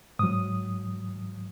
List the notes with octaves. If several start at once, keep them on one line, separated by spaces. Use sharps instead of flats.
G#2 F#3 D#6